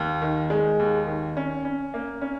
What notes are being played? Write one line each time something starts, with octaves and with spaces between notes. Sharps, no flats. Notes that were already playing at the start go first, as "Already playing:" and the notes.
Already playing: D#2
D#3
G#3
D#2
D#3
C#4
C#4
A#3
C#4